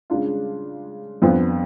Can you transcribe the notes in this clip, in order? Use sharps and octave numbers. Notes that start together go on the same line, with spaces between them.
C#3 G#3 D4 F4
F2 F3 B3 D4 F4